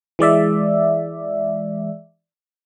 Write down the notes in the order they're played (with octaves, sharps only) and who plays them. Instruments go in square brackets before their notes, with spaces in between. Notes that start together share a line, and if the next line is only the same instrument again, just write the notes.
[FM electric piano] E3 G#3 D5 E5